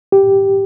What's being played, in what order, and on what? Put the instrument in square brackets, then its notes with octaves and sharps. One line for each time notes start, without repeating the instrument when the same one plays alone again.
[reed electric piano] G4